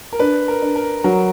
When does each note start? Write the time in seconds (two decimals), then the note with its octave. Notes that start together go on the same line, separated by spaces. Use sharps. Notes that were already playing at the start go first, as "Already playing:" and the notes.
0.13 A#4
0.19 D4 B4
0.48 A#4
0.62 D4
0.76 A#4
1.04 F#3 A#4